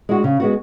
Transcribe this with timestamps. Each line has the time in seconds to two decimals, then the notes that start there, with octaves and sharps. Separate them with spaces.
0.09 G#3 D4 F#4
0.24 C#3
0.40 G#3 B3 F#4